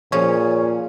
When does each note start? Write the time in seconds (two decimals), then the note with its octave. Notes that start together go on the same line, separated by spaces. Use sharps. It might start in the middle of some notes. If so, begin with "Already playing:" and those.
0.12 A#2 F3 C#4 G#4 C#5